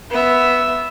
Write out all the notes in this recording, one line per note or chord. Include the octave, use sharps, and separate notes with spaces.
B3 E5